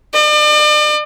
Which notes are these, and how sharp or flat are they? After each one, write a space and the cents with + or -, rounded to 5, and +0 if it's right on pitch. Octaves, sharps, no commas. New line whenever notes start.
D5 +40